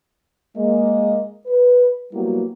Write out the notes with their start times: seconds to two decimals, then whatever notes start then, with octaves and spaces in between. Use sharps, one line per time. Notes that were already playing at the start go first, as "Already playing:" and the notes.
0.55 G#3 A#3 D#5
1.46 B4
2.13 F#3 G3 A#3 B3 E4 F#4